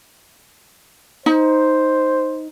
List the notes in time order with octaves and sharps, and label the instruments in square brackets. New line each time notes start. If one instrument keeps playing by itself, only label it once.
[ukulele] D#4 [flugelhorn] C5